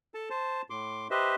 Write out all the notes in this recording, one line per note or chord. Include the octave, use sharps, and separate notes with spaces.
A4 A5
C5 A5
A2 C6 D6
G4 B4 C5 D#5 E5